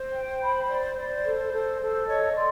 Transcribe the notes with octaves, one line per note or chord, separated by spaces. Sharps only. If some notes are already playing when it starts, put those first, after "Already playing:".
Already playing: C5
G5
B5
D5
D5
A4
A4
A4
C#5 D#5
D5 C6